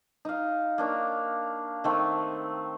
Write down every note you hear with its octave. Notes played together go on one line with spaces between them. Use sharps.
D#4 F5
A#3 D4 C#5
D#3 A3 C4